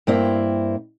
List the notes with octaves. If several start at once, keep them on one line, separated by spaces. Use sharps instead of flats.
G2 A#3 C4 E4